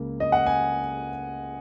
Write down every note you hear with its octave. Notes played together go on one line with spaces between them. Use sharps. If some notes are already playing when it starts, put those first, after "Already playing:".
Already playing: C#2 C#3 A#3
D#5
F#5
G#5